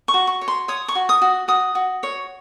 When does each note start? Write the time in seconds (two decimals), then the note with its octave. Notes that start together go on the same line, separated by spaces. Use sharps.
0.08 C#6
0.14 F#4
0.27 C#6
0.41 C#5
0.48 C6
0.68 C#5 D#6
0.88 C#6
0.95 F#4
1.09 D#6
1.22 F#4
1.48 F#4 D#6
1.75 F#4
2.03 C#5